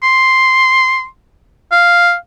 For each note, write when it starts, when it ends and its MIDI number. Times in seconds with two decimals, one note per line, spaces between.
0.02 1.05 84
1.72 2.14 77